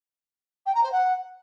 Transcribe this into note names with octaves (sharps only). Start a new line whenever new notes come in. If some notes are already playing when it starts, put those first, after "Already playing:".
G5
A#5
C5
F#5